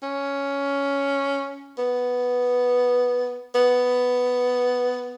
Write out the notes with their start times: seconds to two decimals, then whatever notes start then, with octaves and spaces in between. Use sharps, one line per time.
0.03 C#4
1.78 B3
3.55 B3